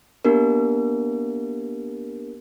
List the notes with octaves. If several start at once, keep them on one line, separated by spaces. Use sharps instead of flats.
A#3 B3 D4 G4 A#4